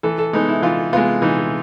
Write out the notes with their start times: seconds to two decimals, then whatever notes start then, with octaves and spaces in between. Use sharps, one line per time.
0.03 E3 A4
0.18 A4
0.33 G#3 B3 D#4
0.49 E4
0.62 E3 F4
0.93 G#3 B3 F4
1.22 E3 D#4